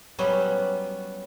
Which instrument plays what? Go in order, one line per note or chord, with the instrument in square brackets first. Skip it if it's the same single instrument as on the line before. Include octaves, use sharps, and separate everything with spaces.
[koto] F#3 G3 B3 C#4 B4